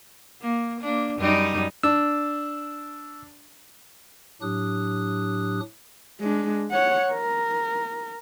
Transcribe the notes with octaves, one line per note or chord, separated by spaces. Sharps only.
A#3
A#3 D4
F#2 G3 D#4
D4 E6
A2 F#3 D4 G4 D#6 F#6
G#3 D4
C#5 F#5
A#4